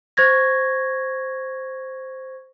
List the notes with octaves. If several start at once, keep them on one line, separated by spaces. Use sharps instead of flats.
C5 C#6 G#6 A#6